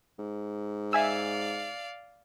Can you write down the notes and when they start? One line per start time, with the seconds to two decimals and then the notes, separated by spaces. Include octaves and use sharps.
0.19 G#2
0.93 D5 E5 F5 G#5 E6